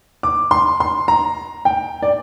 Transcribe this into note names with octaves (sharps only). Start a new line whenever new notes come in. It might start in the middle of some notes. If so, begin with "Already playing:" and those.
D6
C6
C6
A#5
G5
D5